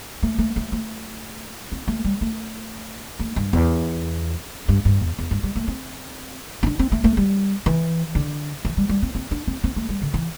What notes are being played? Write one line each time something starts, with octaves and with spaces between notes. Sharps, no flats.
A3
A3
A3
A3
C4
A3
G3
A3
A3
G2
E2
G2
G2
E2
E2
G2
G3
A3
C4
C4
D4
C4
A3
A3
G3
E3
D3
E3
G3
G3
C4
C4
D4
C4
C4
A3
G3
D3
E3